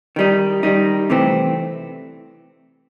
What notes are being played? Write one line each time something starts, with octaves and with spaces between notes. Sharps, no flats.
D#3 G3 D#4
D#3 G3 D#4
C3 E3 A3 C4